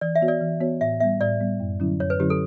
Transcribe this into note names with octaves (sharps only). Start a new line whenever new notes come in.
E3 D5
E5
B3 F#4 C#5
D5
E3
B3 F#4 C#5
A2 E5
G3 B3 E5
A2 D5
G3 B3
F#2
D3 F#3 C#4 E4
F#2 C#5
B4
D3 F#3 C#4 E4 G4
A4